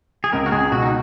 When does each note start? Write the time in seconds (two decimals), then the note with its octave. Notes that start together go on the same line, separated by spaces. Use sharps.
0.24 G#4
0.32 C#2 A#4
0.46 F#4
0.52 C#2 G#4
0.71 B2 F#4
0.82 D#4